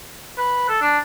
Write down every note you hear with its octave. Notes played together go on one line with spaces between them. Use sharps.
B4
A4
D4